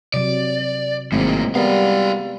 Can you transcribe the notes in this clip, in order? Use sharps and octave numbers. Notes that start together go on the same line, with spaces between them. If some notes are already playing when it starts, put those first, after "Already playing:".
C3 F#3 D5
G#1 A2 F#3 G#3 A#3 C4
G3 B3 F#4 A#4 F5